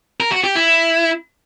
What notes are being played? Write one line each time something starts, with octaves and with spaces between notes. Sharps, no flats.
A#4
F#4
G4
E4